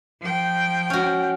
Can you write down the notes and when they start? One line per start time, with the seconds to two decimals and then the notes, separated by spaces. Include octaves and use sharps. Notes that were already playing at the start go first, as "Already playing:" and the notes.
0.21 F3 G5
0.90 C#4 F#4